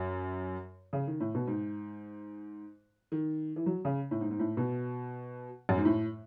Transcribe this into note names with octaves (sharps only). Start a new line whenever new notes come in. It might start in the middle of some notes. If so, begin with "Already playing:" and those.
Already playing: F#2
C#3
D#3
A2
B2
G#2
D#3
E3
F#3
C#3
A2
G#2
G#2
A2
B2
F#2
G#2
A2